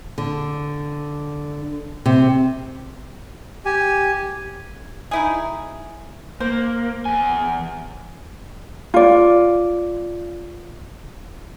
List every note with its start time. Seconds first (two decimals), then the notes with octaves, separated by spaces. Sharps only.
0.18 D3
2.06 C3
3.65 G4 G#5
5.11 D#4 E4 G#4
6.40 A#3 C5
7.05 E2 G#5
8.94 F4 D5